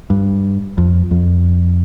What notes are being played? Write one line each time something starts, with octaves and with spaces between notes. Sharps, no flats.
G2
F2
F2